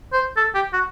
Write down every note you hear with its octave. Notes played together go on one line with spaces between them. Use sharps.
C5
A4
G4
F#4